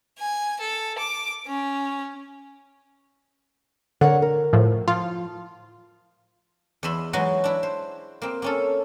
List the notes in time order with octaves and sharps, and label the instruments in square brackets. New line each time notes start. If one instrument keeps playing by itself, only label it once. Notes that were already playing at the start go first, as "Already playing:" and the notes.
[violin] G#5
A4
D6
C#4
[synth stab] D3 [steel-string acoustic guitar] A#4 C#5 F#5
[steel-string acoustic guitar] A#4
[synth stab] A2 F3
[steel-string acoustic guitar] F3 [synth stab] F4
[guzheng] E2 D#5 E5 B5 C6
E3 F#3 G#3 D#4 F#4
D4 E4
C5
A#3 C4
A#3 C#4 A4